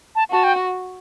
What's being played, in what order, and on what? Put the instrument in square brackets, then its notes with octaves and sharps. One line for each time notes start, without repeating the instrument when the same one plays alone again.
[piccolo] A5
[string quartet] F#4 [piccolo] A5
[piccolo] G5